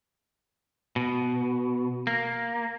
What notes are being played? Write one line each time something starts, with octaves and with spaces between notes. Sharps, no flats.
B2
A#3